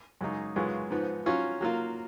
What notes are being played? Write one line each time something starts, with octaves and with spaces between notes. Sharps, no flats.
F#2 C#3 G#3 D#4
F#2 C#3 G#3 B3 F4
G#2 F3 B3
F#3 C#4 F4
F#3 A#3 F4